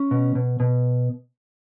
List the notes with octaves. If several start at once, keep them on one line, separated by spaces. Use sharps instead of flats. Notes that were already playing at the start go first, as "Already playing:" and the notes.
Already playing: C#4
B2
B2
B2